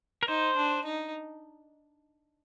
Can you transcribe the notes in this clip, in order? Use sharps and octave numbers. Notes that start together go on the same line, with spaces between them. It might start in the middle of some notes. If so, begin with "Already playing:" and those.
A#4
D#4 C5
D4
D#4